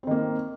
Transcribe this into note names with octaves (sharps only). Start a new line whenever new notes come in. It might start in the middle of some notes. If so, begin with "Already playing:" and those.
D#3 A#3 C4